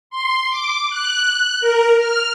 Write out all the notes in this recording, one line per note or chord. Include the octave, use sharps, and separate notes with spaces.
C6
D6
F#6
A#4
F6